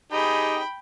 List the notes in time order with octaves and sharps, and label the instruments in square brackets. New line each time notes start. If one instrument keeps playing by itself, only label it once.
[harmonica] D#4 G4 G#4 [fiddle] G5 B5